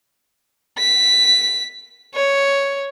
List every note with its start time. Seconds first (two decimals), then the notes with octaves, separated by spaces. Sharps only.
0.78 B6
2.15 C#5